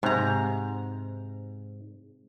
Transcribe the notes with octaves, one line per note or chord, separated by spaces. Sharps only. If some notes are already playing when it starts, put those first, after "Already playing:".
G#2 C3 A#5